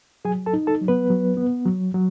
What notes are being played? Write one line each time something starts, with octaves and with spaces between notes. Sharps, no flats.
F#3 G#4 G#5
A4 A5
D#4
A4 A5
F#3
B3 B4
F#3
B3
F#3
F#3